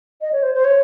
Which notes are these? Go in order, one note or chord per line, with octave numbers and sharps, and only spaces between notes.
D#5
C#5
C5
C5
C#5